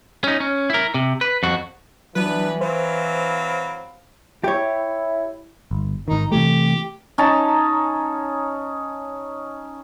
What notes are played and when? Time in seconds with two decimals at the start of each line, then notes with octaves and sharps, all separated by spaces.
0.24 C#4 D#4
0.40 C#4
0.70 E4 A#4
0.94 C3
1.21 B4
1.43 F2 F#4
2.16 E3 F#3 B3 D4 B4
2.61 F#3 C4 C5 F5 B5
4.44 E4 G4 C#5
5.71 G1
6.08 G#1 D#3 D#4
6.32 C3 E3 A3 G4
7.18 C#4 D#4 A5 A#5